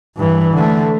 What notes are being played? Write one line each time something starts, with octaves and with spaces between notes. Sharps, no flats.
G2 E3
D3 A3